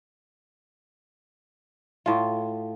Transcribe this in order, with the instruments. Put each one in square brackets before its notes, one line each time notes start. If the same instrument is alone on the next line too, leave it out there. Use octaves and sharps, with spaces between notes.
[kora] A2 F4